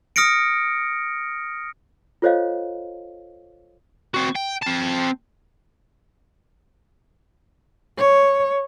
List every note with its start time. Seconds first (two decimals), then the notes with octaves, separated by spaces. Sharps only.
0.16 D#6 F6 A#6 C#7 D7
2.22 F4 A4 C5 C#5 D#5 F5
4.14 C4 F#4
4.35 G5
4.62 C4 A5
7.98 C#5